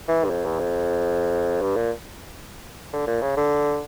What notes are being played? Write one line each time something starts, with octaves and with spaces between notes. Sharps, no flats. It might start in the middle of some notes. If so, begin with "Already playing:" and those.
E3
G2
F2
E2
F2
G2
A#2
D3
A#2
C#3
D3